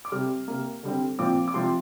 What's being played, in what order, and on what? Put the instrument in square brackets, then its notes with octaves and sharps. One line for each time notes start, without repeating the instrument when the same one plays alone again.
[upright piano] D6
C3 G3 C4 F6
C3 A#3
D3 G3 C4
A#2 F3 C4 D6
D6
C3 F3 C4 C6